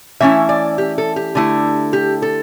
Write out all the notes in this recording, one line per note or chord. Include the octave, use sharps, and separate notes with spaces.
E3 A3 C#4 E4 E5
D5
G4
A4
G4
D3 A3 E4
G4
A4